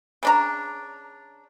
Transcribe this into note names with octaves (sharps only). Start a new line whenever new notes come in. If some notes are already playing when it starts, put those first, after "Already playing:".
C#3 D4 A#5